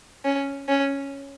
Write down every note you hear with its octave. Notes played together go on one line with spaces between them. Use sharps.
C#4
C#4